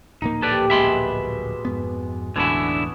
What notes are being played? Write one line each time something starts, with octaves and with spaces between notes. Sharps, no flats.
D1 A#1 A#3 D#4
G4 A4 B4 D5
B2 G#3 E5 B5 C6
F2 G#2 B3
E1 A1 D3 B3 D4 E4 F#4 G#5